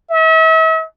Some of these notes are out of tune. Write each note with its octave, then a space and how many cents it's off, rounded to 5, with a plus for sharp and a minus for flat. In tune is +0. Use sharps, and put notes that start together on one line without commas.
E5 -40